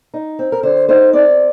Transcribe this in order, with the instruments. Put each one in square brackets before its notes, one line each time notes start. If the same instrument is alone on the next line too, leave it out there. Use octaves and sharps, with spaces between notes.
[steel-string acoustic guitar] D#4
C4
A#4
D3 C5
D#4 C5
C4 D5